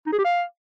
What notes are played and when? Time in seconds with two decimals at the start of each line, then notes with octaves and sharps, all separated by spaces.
0.06 D#4
0.12 G#4
0.19 G4
0.25 F5